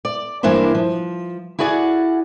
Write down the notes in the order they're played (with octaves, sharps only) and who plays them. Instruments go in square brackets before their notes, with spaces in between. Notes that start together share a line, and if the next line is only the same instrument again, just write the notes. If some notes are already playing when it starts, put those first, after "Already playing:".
[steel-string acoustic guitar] D5
G2 E3 A#3 D4 E4 C5
F3
E4 F#4 G#4 D5 F#5